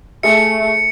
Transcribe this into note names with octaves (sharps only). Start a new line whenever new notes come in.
A3 G#4 E5 C#7